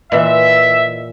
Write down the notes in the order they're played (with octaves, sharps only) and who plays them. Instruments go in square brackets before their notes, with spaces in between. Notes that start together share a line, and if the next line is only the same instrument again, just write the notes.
[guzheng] A#2 E3 [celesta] D#5 [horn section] E5